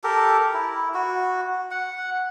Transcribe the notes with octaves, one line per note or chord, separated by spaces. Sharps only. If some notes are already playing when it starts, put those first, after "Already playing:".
G4 A4 A#4
E4
F#4
F#5